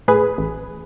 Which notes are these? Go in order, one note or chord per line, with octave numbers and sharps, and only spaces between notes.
A2 G#4 B4
A1